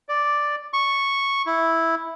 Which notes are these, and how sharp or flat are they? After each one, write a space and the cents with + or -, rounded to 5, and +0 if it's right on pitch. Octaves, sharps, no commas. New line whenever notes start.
D5 +0
C#6 -5
E4 -5